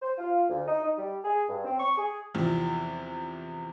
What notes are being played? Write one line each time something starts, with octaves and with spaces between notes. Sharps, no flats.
C5
F4
D2
D#4
D#4
G3
G#4
G2
C4
C#6
G#4
E2 C3 E3 F3